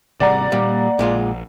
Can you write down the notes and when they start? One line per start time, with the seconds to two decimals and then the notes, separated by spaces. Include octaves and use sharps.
0.20 G#1 C3 G3 D5 F#5 A#5
0.52 A#2 G3 A#3
0.99 A#1 A#2 G#3 F4